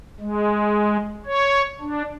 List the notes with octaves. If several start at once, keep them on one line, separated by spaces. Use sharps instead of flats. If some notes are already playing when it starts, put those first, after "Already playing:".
G#3
C#5
D4